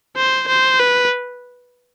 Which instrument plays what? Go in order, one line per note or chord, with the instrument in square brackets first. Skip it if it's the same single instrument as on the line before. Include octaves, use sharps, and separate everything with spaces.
[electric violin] C5
C5
B4